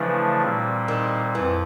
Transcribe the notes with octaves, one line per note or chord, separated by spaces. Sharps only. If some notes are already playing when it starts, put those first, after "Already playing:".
Already playing: C#3 E3 F3 A3 D4
A#2 G3 C4
D#3
F2 E3